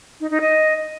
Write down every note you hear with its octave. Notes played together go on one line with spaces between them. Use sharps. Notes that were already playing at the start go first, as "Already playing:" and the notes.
D#4
D#4
D#5